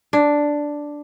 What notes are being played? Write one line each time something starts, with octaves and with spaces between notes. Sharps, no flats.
D4